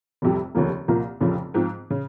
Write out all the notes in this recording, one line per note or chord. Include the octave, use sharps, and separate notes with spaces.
F1 F2 C3 G3
F1 D#2 C#3 F3 A#3
C2 A#2 F3 A#3
F1 F2 C#3 F3
G#2 F3 C4
C#3